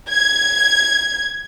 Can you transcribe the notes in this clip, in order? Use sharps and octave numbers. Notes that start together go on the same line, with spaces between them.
G#6